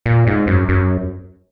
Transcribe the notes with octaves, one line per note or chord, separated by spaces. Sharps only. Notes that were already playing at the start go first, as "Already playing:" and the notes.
A#2
G#2
F#2
F#2